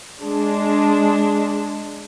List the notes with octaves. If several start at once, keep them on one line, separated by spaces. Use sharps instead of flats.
G#3 D4